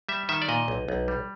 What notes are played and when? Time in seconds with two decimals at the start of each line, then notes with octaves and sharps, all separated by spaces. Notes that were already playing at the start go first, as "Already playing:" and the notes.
0.09 G3 E5
0.29 D#3 E5
0.42 D5
0.48 A#2 D#5
0.68 B1
0.88 B1
1.08 G3